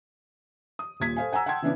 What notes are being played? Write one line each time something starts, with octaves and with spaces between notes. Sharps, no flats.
D#6
D#1 A#2 G#6 B6
A4 C5 F5 G#5
F#5 G#5 A#5 E6
F#5 G5 A5 C6 G#6
C#3 E3 B3 C#4 D4